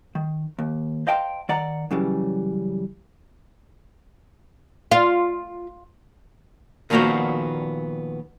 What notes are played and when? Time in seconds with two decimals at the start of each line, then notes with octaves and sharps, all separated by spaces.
0.15 D#3
0.59 D#2
1.07 C5 D#5 F5 G5 A5 C6
1.49 D#3 D5 F#5 A#5
1.91 F#2 C#3 E3 G3
4.91 F4
6.90 A#2 D#3 F3 A#3 B3 F#4